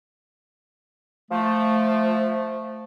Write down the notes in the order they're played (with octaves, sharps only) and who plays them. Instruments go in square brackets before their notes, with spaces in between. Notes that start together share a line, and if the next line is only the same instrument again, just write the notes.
[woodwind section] F3 A3